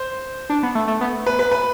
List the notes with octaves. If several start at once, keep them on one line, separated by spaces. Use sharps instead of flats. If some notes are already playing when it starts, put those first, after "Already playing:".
Already playing: C5
D4
B3
A3
A3
B3
B4
B4
B4